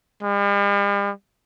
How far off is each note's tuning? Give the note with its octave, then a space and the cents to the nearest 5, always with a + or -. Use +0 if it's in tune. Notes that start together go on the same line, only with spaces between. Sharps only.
G3 +45